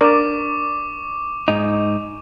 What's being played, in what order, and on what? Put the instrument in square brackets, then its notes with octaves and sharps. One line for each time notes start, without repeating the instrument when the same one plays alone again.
[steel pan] D4 A#4 D5 [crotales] C#6 D6
[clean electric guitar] G#2 D#4